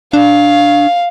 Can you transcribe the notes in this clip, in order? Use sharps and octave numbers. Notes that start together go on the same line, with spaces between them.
D4 F5